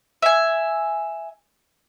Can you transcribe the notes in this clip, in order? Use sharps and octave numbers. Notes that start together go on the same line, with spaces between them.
E5 G#5